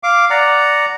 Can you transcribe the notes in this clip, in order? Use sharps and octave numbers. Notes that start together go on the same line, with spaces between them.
F5 D6
D5 F#5 A#5